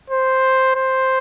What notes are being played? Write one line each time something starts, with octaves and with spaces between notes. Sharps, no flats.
C5
C5